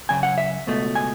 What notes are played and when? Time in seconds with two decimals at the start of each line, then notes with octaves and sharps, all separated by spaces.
0.09 F#2 C#3 G#5
0.23 F#5
0.38 E5
0.67 C#2 B2 A3
0.95 G#5